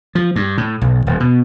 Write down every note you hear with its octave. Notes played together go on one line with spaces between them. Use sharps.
F3
G2
A2
B1
D#1
B2